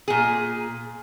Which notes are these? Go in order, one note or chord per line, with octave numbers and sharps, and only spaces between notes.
A#2 G#4